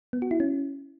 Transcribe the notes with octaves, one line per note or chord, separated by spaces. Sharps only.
B3
F#4
E4
C#4